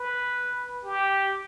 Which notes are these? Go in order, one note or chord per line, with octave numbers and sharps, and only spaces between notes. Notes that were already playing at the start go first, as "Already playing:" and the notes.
Already playing: B4
G4